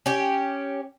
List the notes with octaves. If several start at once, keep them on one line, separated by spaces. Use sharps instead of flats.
C#4 G4